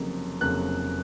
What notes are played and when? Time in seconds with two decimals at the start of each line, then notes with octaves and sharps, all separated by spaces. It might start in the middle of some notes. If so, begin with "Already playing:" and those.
Already playing: F1 F2 C#3 F#3 A#3
0.41 F1 F2 C#3 F#3 A#3 F#6